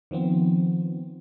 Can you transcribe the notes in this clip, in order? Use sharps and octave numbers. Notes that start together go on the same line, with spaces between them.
D#3 F3 B3 C4